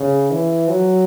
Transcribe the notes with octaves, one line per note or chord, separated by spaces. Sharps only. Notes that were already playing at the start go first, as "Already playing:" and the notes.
Already playing: C#3
E3
F#3